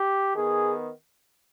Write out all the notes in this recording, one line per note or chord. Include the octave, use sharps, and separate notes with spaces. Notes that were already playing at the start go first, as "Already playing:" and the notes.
Already playing: G4
D#3 B3 G#4